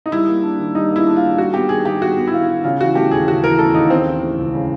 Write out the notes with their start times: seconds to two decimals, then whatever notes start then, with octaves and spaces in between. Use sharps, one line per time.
0.06 D#4
0.12 G3 E4
0.27 A#3
0.43 D4
0.59 D#3
0.75 G3 D#4
0.91 A#3
0.96 E4
1.07 D4
1.17 F4
1.22 D#3
1.38 G3 F#4
1.54 B3 G4
1.69 D#3 G#4
1.85 D#3 G4
2.01 G3 F#4
2.17 B3
2.28 E4
2.33 D#3 F4
2.49 D#3
2.64 C#3 F4
2.80 E3 F#4
2.95 A3 G4
3.11 D#2 G#4
3.27 C#3 F#4
3.43 E3 A#4
3.59 A3 A4
3.74 D#2 D#4
3.90 C#3 C4
4.07 E3
4.22 A3
4.38 C#2
4.54 C#3